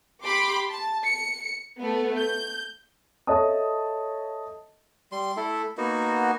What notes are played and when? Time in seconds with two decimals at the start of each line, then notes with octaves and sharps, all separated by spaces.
0.23 G4 B5 C6 D6
0.70 A5
1.04 C#7
1.77 A3 B3
2.17 G6
3.27 A4 C#5 D#5 E5 A5 D#6
5.12 G3 C6
5.37 A3 E4 A4
5.77 A#3 B3 D#4 F#4